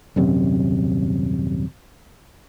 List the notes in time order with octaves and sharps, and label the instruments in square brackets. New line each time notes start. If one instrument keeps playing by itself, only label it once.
[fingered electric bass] D#1 F#2 C3